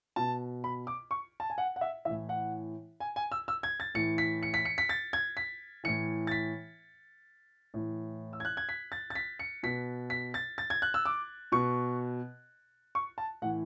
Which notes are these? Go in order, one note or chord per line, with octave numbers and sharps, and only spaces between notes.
B2 A5
B5
D6
C#6
A5
G#5
F#5
F#5
E5
A2 E3 E5
F#5
G#5
G#5
E6
E6
G#6
A6
A2 E3 C#7
B6
C#7
B6
C#7
B6
A6
G#6
B6
A2 E3 C#7
A6
B6
A2 E3
E6
G#6
F#6
G#6
B6
A6
A6
B6
C#7
B2 B6
B6
A6
A6
G#6
F#6
E6
D6
B2 C#6
C#6
A5
A2 E3 F#5